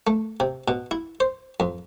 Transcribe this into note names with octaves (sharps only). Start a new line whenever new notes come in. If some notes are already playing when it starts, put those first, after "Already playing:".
A3
C3
B2
E4
C5
F2